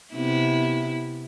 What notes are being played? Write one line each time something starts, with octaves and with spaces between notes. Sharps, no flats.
C3 B3 E4